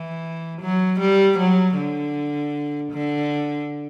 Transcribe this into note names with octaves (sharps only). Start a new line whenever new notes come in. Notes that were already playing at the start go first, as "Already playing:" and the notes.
Already playing: E3
F#3
G3
F#3
D3
D3